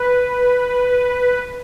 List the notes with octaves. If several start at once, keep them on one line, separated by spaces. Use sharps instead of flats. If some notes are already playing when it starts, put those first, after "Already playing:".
Already playing: B4